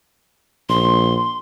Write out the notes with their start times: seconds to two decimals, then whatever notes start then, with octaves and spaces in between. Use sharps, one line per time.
0.69 A#1 C6